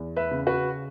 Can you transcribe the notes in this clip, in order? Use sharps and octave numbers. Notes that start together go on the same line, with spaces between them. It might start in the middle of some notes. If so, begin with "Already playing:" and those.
Already playing: E2
B4 E5
C#3
F#4 B4